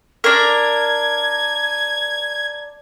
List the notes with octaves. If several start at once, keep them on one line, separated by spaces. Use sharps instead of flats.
D4 A#4 G#6